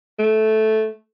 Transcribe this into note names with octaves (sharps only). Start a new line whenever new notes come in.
A3